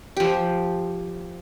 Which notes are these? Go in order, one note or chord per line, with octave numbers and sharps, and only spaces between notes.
F3 G4